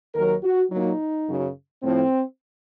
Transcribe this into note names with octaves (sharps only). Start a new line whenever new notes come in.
D#2 D#3 F#3 A#4
F#4
A#2 F#3 D#4
F#2 C#3 F#3
A2 F3 C4